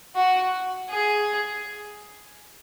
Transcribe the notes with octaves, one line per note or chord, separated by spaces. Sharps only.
F#4
G#4